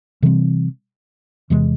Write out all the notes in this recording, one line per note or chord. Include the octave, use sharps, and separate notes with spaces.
C3 E3 G3 C4
E2 C3 E3 G#3